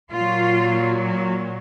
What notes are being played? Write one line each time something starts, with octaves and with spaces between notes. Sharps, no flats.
A#2 F#3 F4